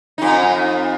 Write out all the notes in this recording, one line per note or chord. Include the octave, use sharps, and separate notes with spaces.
F2 D#4